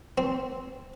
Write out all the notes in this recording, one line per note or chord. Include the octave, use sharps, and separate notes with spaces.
C4